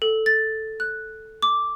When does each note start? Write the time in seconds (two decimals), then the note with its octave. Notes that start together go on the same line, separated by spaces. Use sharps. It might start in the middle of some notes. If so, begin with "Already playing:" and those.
0.02 A4
0.26 A6
0.80 F#6
1.42 D6